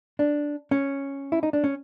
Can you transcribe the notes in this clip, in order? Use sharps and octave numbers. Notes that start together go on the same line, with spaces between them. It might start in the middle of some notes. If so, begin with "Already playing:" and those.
D4
C#4
E4
D#4
D4
C#4